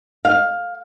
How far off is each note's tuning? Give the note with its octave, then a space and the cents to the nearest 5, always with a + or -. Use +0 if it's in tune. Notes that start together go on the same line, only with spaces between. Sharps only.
F5 +15